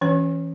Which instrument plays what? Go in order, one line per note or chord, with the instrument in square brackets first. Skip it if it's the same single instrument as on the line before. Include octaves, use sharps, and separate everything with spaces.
[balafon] E3 C#4 C#5